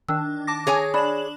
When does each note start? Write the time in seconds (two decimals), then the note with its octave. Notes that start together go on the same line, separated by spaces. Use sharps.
0.09 D#3 D4 E6
0.47 A5 D6 A#6
0.67 G#4 C#5 G#5
0.94 D4 D5 B5 E7 F#7